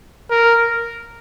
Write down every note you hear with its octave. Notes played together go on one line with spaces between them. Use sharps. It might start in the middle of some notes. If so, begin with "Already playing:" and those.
A#4